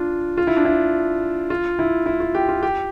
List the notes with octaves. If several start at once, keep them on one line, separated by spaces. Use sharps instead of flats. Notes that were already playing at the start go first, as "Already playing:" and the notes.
Already playing: D4 F4
F4
E4
D4
E4
F4
E4
E4
F4
G4
F4
G4